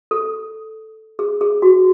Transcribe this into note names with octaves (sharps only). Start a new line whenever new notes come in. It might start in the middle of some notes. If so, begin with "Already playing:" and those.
A4
G#4
G#4
F#4